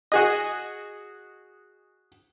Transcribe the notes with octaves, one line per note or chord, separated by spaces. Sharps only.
F#4 G#4 D#5